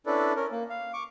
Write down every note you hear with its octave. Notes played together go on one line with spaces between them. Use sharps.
C#4 D4 E4 A4 B4 D5
C#4 A#4
A#3
F5
C#6 D6